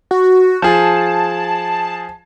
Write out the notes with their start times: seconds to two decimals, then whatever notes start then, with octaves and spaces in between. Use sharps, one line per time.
0.11 F#4
0.62 F3 G#4 A5